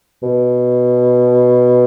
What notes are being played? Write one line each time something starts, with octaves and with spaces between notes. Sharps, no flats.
B2